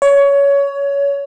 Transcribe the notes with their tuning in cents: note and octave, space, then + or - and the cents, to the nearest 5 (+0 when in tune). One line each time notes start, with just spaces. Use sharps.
C#5 +20